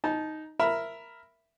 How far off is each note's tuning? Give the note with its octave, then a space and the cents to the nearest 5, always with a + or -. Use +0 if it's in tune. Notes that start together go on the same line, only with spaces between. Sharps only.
D#4 +0 A5 -25
A#4 +0 E5 +10 B5 +0